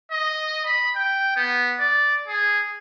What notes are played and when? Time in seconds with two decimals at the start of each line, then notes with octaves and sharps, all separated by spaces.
0.11 D#5
0.65 B5
0.96 G5
1.36 B3
1.79 D5
2.28 G#4